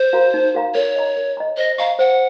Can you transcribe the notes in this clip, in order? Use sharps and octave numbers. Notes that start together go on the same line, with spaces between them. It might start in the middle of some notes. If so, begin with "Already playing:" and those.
Already playing: C5
F#4 A#4 F5 A#5
D#4
F#4 A#4 F5 A#5
A#4 C#5
D#5 A#5
A#4
D#5 A#5
C5 D#5
D#5 F5 A#5 C#6
C5 F#5